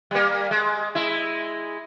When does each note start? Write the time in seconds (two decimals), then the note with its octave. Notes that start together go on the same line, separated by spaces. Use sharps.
0.11 G3 A#3
0.51 G#3
0.95 G#3 E4